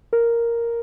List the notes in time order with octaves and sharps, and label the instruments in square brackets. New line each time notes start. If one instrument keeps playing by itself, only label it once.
[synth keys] A#4